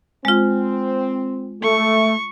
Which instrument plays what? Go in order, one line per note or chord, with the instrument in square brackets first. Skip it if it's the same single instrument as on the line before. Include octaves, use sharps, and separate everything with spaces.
[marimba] G#3 F4 [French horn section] C4
[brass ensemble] A3 [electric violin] C#6